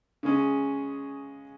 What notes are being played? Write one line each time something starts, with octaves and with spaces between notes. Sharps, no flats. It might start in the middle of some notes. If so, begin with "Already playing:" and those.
C#3 G#3 C#4 G#4